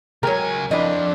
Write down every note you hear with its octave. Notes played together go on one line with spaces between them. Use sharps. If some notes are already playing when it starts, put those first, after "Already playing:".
C#2 F#3 A#4 C#5 G5 G#5
F3 C4 D4 E4 D#5